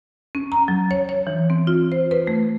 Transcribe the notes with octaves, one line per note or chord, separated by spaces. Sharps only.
C#4
A#5
F#3
C#5
C#5
E3
C4
F4
C5
B4
A3